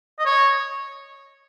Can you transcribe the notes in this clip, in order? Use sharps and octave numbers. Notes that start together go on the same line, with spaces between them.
D#5
C#5